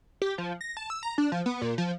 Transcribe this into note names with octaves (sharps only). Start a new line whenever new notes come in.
G4
F3
A#6
A5
E6
A#5
D4
F3
B3
A#2
F3